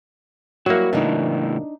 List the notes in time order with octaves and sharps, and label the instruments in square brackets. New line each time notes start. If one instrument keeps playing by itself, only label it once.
[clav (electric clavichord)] F#3 A#3 [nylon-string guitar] G3 E4 [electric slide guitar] F#4
[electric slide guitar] A2 C#3 E3 [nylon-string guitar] D4 D#4